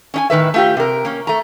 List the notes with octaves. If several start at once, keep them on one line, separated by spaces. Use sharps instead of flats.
C#4 D4 G#5
A2 D#3 B4 E5
A3 F4 G4
C3 A#4
A#3 C#4
A3 A#5